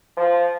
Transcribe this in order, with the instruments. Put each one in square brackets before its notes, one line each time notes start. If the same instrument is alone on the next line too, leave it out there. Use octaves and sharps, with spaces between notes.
[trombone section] F3